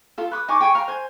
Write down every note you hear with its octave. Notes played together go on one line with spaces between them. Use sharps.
F4 A4
B4 C#6 D#6
D#4 G#5 C#6 D6
G5 G#5 C6 C#6
F5 A#5 C6
C5 G#5